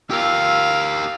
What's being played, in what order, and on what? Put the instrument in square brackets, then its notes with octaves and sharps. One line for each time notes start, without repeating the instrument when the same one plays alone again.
[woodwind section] F4 E6 [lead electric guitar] G4 A#4 [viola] F5